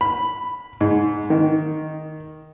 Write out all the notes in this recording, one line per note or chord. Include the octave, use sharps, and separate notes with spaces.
B5
G#2
D#3